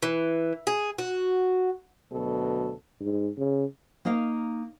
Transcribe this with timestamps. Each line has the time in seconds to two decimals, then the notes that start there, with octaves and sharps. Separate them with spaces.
0.02 E3
0.67 G#4
0.98 F#4
2.12 D2 B2 F#3 A4
3.01 G#2
3.38 C#3
4.05 A#3 D#4 D#5 F5